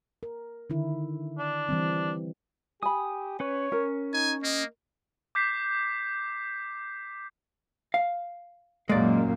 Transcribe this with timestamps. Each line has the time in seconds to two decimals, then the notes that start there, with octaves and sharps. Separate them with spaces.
0.23 A#4
0.70 D3 D#3 E4
1.38 D4
1.69 E3 G3 C4
2.83 G4 G#5 B5 D#6
3.40 C#4 B4 C#5
3.72 C#4 A#4
4.13 D#4 G#5
4.43 A#3 D#5
5.35 D6 G6 B6 C7
7.94 F5
8.89 F#2 A#2 G#3 A#3 D5